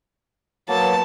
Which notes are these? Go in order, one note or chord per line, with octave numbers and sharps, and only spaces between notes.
F#3 A#3 B3 A5